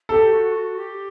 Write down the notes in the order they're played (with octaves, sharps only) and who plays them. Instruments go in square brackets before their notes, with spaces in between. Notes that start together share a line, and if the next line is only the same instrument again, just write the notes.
[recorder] G4 [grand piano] A4
[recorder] F#4
F#4
G4